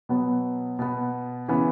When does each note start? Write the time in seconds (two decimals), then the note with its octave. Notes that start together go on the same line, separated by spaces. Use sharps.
0.09 B2 F#3 B3
0.79 B2 B3
1.48 C#3 E3 B3